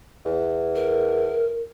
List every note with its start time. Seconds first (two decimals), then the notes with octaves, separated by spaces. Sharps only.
0.25 E2
0.76 A#4